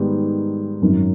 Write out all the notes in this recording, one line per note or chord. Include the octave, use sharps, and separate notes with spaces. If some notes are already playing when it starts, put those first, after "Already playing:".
Already playing: G#2 D#3 G3 B3
G#1 F#2 D#3 F#3